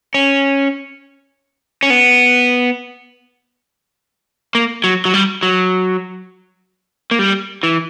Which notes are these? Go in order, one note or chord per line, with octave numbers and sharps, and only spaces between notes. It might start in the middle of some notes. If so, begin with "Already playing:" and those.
C#4
C#4
B3
A#3
F#3
F#3
G3
F#3
A#3
G3
E3